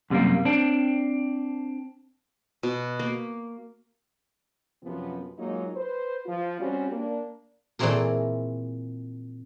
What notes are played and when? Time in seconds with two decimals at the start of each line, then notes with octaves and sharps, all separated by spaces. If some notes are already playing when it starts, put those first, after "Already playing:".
0.10 F#2 C3 G3 A3 A#3
0.45 C4 D4
2.63 B2
2.99 A#3
4.83 F#2 C3 F3 B3
5.37 F#3 G#3 A#3 D#4 F4
5.75 B4 C5
6.26 F3 F4
6.59 G3 C4 C#4 F#4
6.91 A#3 D4
7.79 A#2 E3 A3 C4 G#4 A#4